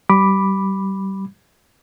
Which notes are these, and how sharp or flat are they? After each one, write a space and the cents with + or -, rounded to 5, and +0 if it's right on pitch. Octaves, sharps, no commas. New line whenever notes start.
G3 -25 B5 +0 D6 +0